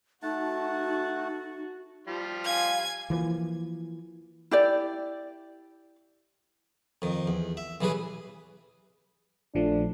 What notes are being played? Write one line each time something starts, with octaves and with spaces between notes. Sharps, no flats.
A3 D#4 F#4 F#5 A5
F3 G3 F4
F5 G#5 G#6
E3 F3 A#3
E4 G4 D5
F2 D#3
E2
E5
B1 E3 G3 G#4 B4
A#1 F3 A3 D4